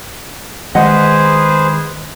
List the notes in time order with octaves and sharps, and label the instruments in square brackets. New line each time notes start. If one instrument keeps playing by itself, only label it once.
[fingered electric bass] D#3 G#3 [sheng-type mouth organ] G#4 B4 C5 [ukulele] D#5 F#5